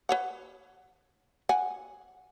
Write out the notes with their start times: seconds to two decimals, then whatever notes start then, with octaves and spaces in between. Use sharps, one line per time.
0.09 B4 C#5 F#5
1.49 F#5 G#5